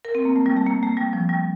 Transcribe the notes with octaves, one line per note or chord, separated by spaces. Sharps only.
A#4
C4
A#3
A3
G3
A3
A#3
A3
G3
F3
G3